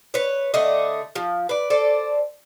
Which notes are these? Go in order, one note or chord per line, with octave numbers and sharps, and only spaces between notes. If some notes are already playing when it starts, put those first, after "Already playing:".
B4 C#5
D3 A3 D#5
F3
B4 D5
A4 C5 D5